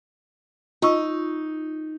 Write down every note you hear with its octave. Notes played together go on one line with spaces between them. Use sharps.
D#4 F4 C#6 E6